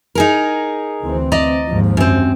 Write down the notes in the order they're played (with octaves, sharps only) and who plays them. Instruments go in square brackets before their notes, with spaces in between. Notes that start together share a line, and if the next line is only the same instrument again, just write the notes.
[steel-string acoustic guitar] D#4 G#4 A#4
[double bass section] D2 E3 C4
[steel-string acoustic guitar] D5 D#5 A#5
[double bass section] D#2 G#2 F3
[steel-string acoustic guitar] F#2 C4